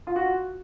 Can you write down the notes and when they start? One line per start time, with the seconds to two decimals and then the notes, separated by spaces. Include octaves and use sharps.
0.07 F4
0.16 F#4